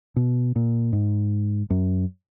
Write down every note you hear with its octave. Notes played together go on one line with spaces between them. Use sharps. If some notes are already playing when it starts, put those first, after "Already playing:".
B2
A#2
G#2
F#2